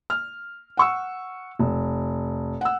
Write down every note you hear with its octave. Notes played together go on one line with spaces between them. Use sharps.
F6
F#5 C#6 E6
F1
F#5 E6